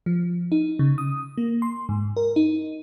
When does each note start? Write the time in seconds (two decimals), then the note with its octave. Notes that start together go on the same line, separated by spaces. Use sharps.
0.06 F3
0.52 D#4
0.79 C#3
0.98 D#6
1.38 A#3
1.62 C6
1.89 G#2
2.17 A#4
2.36 D#4